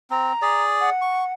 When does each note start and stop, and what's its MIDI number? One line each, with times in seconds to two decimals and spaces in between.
0.10 0.33 60
0.10 0.62 82
0.42 0.90 68
0.42 0.90 74
0.80 1.31 78
1.01 1.24 85